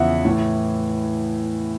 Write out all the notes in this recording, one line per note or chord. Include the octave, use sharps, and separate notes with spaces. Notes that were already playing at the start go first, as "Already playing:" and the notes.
Already playing: E2 C#3 F3 E5 F#5
A2 E3